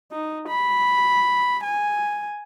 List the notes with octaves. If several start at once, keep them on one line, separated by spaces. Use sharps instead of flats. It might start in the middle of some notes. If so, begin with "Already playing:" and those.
D#4
B5
G#5